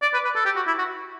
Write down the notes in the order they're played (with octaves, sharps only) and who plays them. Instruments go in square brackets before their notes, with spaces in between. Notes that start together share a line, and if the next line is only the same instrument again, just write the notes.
[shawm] D5
B4
B4
A4
G4
F#4
E4
F#4